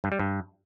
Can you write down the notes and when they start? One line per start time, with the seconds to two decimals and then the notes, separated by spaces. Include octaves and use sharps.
0.04 G2
0.12 G3
0.19 G2